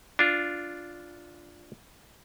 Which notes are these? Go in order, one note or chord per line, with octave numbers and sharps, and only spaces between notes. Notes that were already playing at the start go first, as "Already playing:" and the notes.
D4 F4